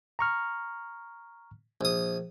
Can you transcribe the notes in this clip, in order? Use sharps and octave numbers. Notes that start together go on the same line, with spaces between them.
A#5 C#6 F6
A#1 D#6